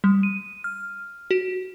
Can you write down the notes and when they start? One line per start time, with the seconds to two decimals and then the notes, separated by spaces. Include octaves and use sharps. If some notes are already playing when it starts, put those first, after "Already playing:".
0.04 G3
0.23 D#7
0.64 F6
1.31 F#4